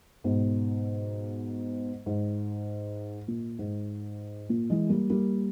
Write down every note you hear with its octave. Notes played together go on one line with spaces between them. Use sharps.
G#2 B2
G#2
A#2
G#2
A#2
E3 G#3
G3 A#3
G3 A#3